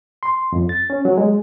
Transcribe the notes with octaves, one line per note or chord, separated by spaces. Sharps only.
C6
F2
A6
C#4
F#3
G#3